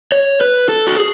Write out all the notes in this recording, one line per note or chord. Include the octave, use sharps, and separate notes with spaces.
C#5
B4
A4
F#4
G#4